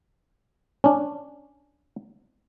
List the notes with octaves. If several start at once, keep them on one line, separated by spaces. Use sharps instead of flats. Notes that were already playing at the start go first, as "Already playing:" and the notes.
C#4 D4